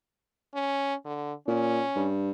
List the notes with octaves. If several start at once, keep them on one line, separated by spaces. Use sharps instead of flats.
C#4
D3
A#2 C#4
G2